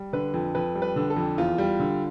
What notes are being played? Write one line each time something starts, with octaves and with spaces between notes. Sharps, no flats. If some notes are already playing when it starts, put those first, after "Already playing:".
Already playing: G3
D3 B4
F2
F2 B4
G3
B4
D3
A4
F2
E2 F4
G3
D3